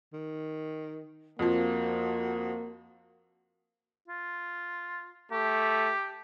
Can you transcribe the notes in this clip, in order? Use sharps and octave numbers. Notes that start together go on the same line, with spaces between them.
D#3
F2 F3 A#3 F#4
F4
A3 G4